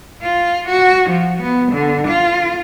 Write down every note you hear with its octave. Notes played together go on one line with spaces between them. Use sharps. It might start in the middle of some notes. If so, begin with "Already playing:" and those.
F4
F#4
F3
B3
D3
F4